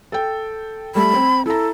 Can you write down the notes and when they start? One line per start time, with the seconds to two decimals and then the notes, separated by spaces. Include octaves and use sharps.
0.12 A4 G5
0.95 G3 A3 B5
1.13 C4
1.46 E4 A4 A#5